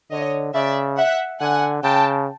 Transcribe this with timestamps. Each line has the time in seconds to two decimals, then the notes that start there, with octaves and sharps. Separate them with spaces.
0.11 D3 C#5 D#5
0.54 C#3 D5 E5
0.98 E5 F#5
1.40 D3 F#5 G#5
1.83 C#3 G5 A5